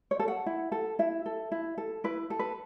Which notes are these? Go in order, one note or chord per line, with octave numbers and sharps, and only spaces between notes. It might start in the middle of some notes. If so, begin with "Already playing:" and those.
C#5
A4
F#5
E4
A4
E4 E5
A4
E4
A4
E4 B4
A4
B4